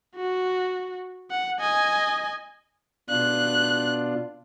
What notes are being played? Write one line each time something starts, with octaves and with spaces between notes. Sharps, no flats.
F#4
F#5
D#5 G#5
B2 D4 F4 F#6